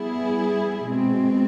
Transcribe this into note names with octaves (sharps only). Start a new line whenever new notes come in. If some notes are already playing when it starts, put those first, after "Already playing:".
Already playing: G3 B3 E4 G#4
B2 G#3 C4